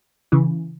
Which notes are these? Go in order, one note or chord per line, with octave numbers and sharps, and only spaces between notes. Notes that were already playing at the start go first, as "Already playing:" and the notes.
C#3 E3